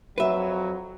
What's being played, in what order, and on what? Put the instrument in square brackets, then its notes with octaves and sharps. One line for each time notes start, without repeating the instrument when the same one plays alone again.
[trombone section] F2 F#3 [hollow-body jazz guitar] B4 E5